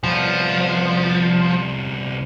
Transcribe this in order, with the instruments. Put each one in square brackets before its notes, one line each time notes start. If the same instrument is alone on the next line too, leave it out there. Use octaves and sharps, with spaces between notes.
[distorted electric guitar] C2 B3 [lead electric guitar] F3